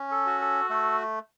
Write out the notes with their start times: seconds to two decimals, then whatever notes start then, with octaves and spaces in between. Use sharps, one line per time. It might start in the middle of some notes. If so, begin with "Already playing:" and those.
Already playing: C#4
0.11 A4
0.26 F#4
0.41 A4
0.70 A3 A4